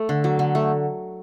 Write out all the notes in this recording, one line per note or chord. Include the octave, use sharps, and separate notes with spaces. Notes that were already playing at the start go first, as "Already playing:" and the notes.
Already playing: A3
D3
F#3
D3
A3